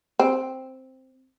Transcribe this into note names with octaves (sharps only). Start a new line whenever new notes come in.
C4